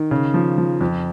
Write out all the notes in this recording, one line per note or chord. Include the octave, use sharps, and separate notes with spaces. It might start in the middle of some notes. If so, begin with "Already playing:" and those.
Already playing: D#3
C#3
F3
F3
F2